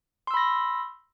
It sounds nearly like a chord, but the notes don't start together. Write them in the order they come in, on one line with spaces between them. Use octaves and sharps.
C6 E6 B5 A#6